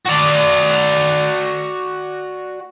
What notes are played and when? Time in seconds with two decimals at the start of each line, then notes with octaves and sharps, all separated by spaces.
0.06 F#4 D5